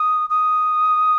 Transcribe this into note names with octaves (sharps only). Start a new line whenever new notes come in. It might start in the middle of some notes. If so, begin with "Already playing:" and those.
Already playing: D#6
D#6